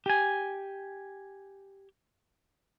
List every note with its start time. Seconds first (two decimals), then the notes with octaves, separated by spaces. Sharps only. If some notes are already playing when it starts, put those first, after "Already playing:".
0.06 G4 G#5